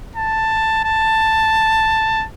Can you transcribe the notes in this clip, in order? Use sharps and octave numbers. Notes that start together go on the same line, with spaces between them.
A5
A5